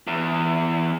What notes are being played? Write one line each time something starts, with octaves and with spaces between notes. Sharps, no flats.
E2